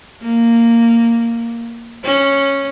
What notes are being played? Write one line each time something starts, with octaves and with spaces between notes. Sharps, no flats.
A#3
C#4